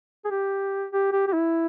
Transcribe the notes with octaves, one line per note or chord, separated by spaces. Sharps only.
G#4
G4
G4
G4
G4
E4